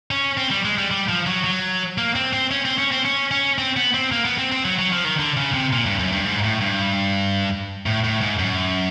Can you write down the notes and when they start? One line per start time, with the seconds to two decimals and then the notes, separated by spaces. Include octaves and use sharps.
0.11 C#4
0.37 C4
0.51 G3
0.65 G#3
0.78 G3
0.91 G3
1.09 F3
1.27 F#3
1.44 F#3
1.98 A#3
2.16 C4
2.33 C4
2.51 C#4
2.65 C4
2.78 C#4
2.92 C4
3.05 C#4
3.31 C#4
3.58 C4
3.77 B3
3.94 C4
4.12 A#3
4.25 B3
4.38 C4
4.52 C4
4.65 F#3
4.79 F#3
4.92 F3
5.05 D#3
5.19 D3
5.37 C#3
5.54 C3
5.73 A#2
5.86 G2
5.99 F#2
6.12 G2
6.25 G#2
6.44 A2
6.61 G2
7.86 A2
8.04 A2
8.21 G#2
8.39 F#2